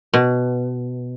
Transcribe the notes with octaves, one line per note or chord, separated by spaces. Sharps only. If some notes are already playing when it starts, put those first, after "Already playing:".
B2